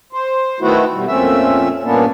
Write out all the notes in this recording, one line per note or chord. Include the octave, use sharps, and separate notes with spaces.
C5
D#3 A3 B3 E4 F#4
B2 G3
F2 A#2 A3 C4 C#4 E5
G2 A#2 A#3 B3 C#4 D4